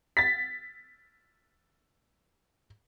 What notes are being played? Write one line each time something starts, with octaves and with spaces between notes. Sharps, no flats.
A6 B6